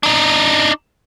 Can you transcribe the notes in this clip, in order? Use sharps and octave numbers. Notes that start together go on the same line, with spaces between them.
D4 D#4